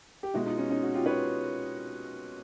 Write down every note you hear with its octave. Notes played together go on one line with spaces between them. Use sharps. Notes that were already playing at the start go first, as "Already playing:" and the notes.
G4
B2 G#3 E4 F#4
D#4 F4
C#4 D#4
C#4 D#4
F#4
F4 G4
B4 C#5